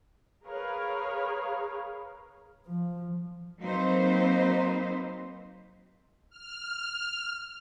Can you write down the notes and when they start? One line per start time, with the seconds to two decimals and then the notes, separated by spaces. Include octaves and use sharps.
0.45 G#4 A#4 B4 C#5 F5
2.67 F3
3.60 F#3 A#3 C4 D#4 B4 C5
6.30 F6